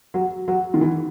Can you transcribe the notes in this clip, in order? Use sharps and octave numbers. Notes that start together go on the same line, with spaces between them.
F#3
F#3
D#3
E3